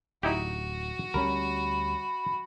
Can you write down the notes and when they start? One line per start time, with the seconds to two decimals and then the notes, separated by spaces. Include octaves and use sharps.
0.23 D1 D#4 E4 F#4 G4
1.14 D2 G3 C#4 A#4 B5